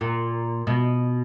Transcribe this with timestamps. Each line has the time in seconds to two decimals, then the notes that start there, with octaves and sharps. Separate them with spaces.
0.01 A#2
0.67 B2